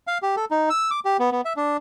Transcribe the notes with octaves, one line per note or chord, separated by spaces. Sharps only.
F5
G4
A4
D#4
E6
D6
G4
B3
B3
E5
D4